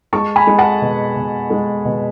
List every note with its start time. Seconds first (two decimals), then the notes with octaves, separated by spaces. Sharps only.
0.13 G#3 A5 C#6
0.36 G#5 B5
0.47 G#3
0.58 F#5 A5
0.82 B2
1.16 B2
1.50 G#3
1.85 B2